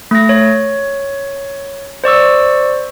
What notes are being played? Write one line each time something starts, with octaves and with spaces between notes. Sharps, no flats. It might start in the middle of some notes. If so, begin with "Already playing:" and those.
A3 A#6
C#5
C5 D5 C#6 E6